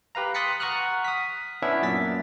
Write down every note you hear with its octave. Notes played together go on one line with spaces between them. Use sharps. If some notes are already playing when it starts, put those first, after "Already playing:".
G4 B4 F5 A#5
C6 D#6 F#6 A6 B6 C#7
F#5 A#5 C#6 D#6 F6 F#6
D#6 B6
B3 C#4 D4 E4 E5
F#2 A#2 A6 B6